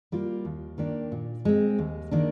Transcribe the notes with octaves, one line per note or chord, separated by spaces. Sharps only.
G3 A#3 F4
D#2
D#3 A#3 D4 G4
A#2
G#3 C4
D#2
D#3 A#3 D4